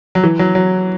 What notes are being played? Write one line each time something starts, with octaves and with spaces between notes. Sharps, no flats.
F#3
E3
F#3
F#3